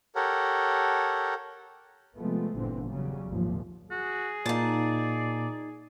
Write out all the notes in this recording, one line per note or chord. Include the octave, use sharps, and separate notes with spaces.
G4 A4 A#4 C#5 F#5
C3 F3 G#3 A3 B3
G1 A#2 D3 E3 C4
E2 C#3 F#3 G3
G#1 D#2 A#2 F3
F#4 G#4
A#2 A#3 D#4 D5 A5